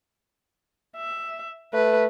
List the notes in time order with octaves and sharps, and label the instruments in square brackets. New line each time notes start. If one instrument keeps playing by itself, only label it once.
[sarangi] E5
[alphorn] A3 [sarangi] B4